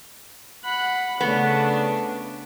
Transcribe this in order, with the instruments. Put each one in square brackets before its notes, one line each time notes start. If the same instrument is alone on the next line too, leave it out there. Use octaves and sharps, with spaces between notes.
[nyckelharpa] F#5 B5
[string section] C#3 D4 [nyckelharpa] A3 [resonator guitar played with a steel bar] B3